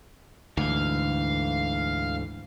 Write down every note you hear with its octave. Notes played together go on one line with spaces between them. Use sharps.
D2 G#2 D3 E3 F5